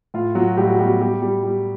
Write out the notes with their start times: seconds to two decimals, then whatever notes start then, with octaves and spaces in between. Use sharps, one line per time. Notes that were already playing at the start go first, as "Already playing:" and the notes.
0.14 A2 F4
0.35 A2 F#3 F#4
0.57 A2 G3 G4
0.69 F#4
0.78 G3 B3 G4
1.00 G3 G4
1.22 G3
1.43 G3